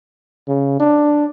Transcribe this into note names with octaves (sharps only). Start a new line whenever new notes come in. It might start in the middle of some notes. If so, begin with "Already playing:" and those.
C#3
D4